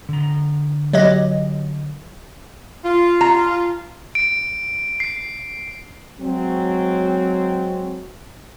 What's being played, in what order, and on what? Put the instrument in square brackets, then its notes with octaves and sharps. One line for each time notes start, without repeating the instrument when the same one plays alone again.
[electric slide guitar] D3 A#5
[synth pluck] F#3 G4 D#5
[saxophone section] F4
[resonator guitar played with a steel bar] A#5
[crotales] D7
C7
[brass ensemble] F#3 G#3 C4